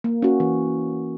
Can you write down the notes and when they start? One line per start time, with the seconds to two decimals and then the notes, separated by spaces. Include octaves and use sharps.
0.04 A#3
0.22 C#4 F#4
0.40 E3